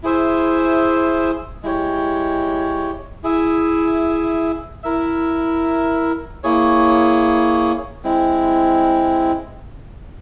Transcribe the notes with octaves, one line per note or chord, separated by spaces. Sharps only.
E4 G#4 C5 E5
G#3 E4 G4 C#5
E4 G#4 E5
E4 A#4 E5
A#3 E4 G#4 C#5
G#3 C4 E4